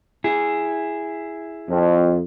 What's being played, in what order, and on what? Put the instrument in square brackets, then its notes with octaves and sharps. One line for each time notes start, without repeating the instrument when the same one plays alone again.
[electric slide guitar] E4 G#4
[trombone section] F2